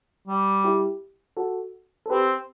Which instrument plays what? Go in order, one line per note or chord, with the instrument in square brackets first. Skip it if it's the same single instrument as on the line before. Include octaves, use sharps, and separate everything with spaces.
[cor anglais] G3
[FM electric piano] E4 G4
F#4 A4
A4
[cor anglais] C4 [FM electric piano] G4 B4